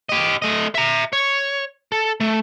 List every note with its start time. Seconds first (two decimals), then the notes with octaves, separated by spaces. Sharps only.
0.09 G4 D#5
0.42 A3 D#5
0.75 E5 A#5
1.13 C#5
1.92 A4
2.20 A3